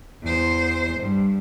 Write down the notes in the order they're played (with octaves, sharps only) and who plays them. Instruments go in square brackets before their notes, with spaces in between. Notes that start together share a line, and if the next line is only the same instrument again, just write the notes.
[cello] E2 C5
G2